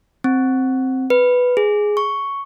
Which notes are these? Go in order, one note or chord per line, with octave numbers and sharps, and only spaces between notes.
C4
B4
G#4
C#6